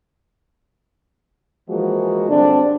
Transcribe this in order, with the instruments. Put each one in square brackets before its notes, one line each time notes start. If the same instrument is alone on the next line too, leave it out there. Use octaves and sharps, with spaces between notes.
[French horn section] E3 F3 G#3 A#3 F#4
G2 D3 C4 D4